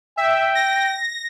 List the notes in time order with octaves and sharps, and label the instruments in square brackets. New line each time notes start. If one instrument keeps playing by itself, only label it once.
[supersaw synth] E5 [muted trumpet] G5
[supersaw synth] A#6